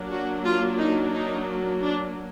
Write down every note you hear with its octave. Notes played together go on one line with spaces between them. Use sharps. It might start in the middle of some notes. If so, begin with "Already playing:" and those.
Already playing: F#3 A#3 D4
F#4
F4
D#4
D#4
D4